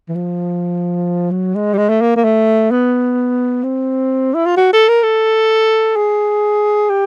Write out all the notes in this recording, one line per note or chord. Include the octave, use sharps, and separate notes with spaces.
E3
F3
F#3
G#3
G3
G#3
A3
A#3
A#3
A3
B3
C4
E4
F4
F#4
A4
A#4
A4
G#4
G4